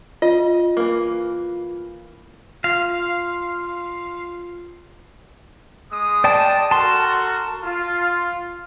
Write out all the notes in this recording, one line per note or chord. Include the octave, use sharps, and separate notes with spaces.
F4 D#5
E3 A#3
F4 F5
G#3 D#6
D5 G5 A5
F#4 A4 A#4 A5 C6
F4